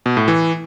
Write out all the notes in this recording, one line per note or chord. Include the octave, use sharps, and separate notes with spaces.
B2
A2
E3